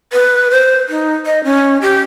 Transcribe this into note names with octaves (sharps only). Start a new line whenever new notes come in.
B4
C5
D#4
D#5
C#4
G4